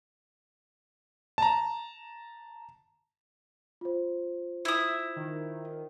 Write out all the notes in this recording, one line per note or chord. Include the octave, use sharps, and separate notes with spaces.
A5 A#5
F4 C5
E4 E5 D#6
D#3